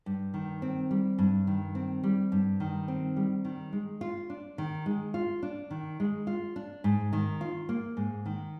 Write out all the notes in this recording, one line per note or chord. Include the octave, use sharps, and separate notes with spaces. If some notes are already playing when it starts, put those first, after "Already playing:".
G2
D#3
C4
G3
G2
D#3
C4
G3
G2
D#3
C4
G3
D#3
G#3
F4
D4
D#3
G#3
F4
D4
D#3
G#3
F4
D4
G#2
D#3
F4
A#3
G#2
D#3